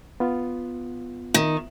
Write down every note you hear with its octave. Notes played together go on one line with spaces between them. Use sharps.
B3 F4
D#3